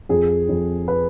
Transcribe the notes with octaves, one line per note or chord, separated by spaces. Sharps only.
F2 G#4
F2
B4